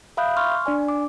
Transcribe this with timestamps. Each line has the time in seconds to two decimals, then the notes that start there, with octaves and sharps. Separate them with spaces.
0.17 E5 F5 B5 D#6 F#6 G6
0.37 C6 C#6 F6
0.66 D4 D5 G#5
0.88 D6